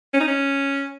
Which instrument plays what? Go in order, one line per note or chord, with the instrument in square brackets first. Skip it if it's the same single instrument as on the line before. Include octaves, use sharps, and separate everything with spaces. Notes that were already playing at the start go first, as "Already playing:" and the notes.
[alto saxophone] C#4
D#4
C#4